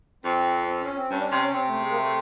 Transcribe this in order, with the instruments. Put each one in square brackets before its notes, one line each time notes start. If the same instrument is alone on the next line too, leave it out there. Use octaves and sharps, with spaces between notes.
[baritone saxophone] F2 [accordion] C4
[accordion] C4
C#4
C4
[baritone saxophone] G2 [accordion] C#4
[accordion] D4
C#4
[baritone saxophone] C3
[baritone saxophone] C3 [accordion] C4
[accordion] A3
G#3
A#3
A3